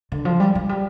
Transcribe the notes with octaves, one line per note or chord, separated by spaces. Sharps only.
D3
F3
G3
F3
G3